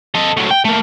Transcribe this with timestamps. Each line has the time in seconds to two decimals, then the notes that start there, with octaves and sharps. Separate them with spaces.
0.15 A4 D#5
0.37 F#3 A3
0.50 G5
0.65 A3 A#3